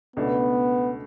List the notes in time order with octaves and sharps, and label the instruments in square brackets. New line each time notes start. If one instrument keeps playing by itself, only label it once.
[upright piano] C#2 B2 A3 D4 [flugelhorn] B3